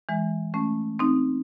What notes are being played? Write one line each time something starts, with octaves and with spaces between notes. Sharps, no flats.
E3 G#3
A3 C#4
C4 D#4